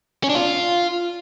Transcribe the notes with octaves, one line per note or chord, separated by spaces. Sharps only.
C#4
D4
F4